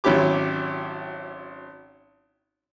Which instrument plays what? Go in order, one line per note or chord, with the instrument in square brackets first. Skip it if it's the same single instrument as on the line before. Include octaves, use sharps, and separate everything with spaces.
[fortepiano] G#1 F#3 C#4 E4 G4 D6